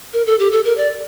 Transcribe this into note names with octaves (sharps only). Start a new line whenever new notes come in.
A#4
A4
G4
A4
A#4
D5